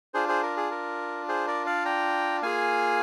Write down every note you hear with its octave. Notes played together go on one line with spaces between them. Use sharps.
D4 F4 G#4 C5
G#4 C5
A#4
G#4
A#4
G#4 C5
A#4 D5
D5 F5
G5 A#5
A#3 F4 G#4 F5 G#5